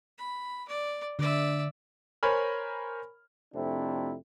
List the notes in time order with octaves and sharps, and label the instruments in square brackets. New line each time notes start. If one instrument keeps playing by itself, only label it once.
[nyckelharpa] B5
D5
[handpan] D3 [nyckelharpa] D5 E5
[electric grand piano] A#4 C5 C#5 G#5 B5 F6
[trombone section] F2 C3 A3 C4 D4 E4